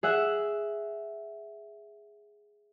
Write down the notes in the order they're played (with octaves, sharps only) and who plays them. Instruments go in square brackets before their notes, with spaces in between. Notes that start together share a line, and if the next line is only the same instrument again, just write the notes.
[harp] G#4 E5 F#5